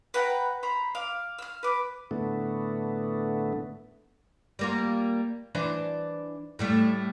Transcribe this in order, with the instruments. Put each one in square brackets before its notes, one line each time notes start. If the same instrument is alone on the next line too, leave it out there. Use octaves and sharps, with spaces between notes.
[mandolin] B4 F#5 G5 A#5
C5 A#5 B5
F5 D6
E6 F6
B4 D6
[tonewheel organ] A2 D3 A3 B3
[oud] G3 A#3 F4
E3 D4 C5
A2 G3 A3